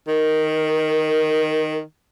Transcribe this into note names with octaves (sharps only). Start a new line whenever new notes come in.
D#3 A#4